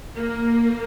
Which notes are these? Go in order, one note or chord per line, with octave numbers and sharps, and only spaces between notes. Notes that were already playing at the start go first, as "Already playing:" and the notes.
A#3